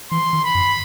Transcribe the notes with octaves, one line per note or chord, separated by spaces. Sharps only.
E3 C6
D#3
B5
F#2